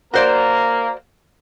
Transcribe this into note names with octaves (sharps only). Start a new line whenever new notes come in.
A#3 F#4 A#4 C5 D5